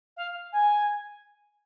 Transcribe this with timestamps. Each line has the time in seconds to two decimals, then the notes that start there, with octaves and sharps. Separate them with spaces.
0.17 F5
0.52 G#5